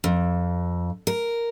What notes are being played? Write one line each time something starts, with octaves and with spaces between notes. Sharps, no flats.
F2
A#4